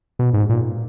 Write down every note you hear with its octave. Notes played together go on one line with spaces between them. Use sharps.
B2
G#2
A#2